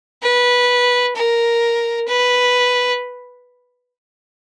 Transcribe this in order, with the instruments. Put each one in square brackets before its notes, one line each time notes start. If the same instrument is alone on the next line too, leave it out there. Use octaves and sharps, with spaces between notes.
[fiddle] B4
A#4
B4